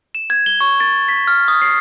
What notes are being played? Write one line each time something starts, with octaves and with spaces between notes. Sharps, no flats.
E7
G#6
G7
C#6
A6
B6
F6
D#6
C7